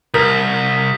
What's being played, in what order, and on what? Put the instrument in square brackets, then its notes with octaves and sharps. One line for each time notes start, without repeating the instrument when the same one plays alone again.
[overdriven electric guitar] C2 [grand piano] A#4 [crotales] D#6 G6 B6